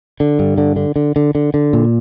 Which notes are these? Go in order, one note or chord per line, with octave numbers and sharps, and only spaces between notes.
D3
G2
D3
D3
D3
D3
D3
D3
A#2